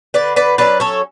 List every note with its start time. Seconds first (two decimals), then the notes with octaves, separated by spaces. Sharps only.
0.14 D3 B4 D5
0.36 B4 D5
0.58 F#3 C#4 B4 D5
0.80 A4 C#5